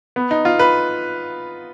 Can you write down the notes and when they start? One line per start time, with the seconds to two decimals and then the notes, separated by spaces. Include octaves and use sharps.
0.16 B3
0.31 D#4
0.45 F4
0.59 B4